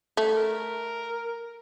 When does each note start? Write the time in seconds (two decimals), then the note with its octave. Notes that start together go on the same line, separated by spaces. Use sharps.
0.17 A3
0.36 A#4